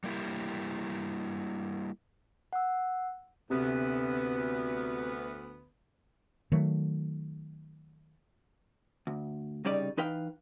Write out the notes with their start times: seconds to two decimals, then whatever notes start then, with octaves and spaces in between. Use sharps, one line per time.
0.04 G3 A#3 E4 G4
2.53 F#5 E6
3.50 D2 C3 B3
6.52 D#3 F#3 A3
9.07 D2
9.65 C2 C#3 G3 D#4 D5
9.97 E3 D#4 B4 F5 G5